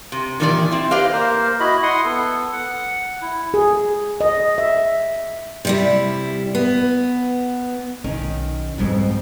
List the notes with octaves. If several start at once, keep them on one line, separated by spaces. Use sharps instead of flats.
C3
A#2 D#3 E3 G3 D4 D5
C4 E4
G4 B4 C5 D5 D#5 F5
A#3 A#4 C5
E4 F#4 D#5 B5
E4 F#5 C6 D#6
B3 A4
F#5
E4
G#4
D#5
E5
C3 G3 E4
B3
B1 D#3 C#4 D#4
F2 G#2 B2 G3 G#3